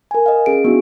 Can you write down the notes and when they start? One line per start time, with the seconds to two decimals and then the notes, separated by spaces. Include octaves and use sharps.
0.11 A#4 G#5
0.26 D#5 F5
0.46 C#4 G#4 D7
0.64 B3 D4 E4 F#4